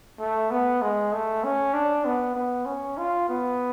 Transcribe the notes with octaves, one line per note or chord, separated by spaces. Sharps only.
A3
B3
G#3
A3
C#4
D4
B3
B3
C#4
F4
B3